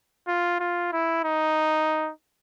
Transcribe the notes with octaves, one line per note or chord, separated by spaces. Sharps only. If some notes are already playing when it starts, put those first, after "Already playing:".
F4
F4
E4
D#4